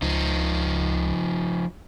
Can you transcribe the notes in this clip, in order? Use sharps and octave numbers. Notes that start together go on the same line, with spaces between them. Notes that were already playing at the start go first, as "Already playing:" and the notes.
C#2 F3 D#4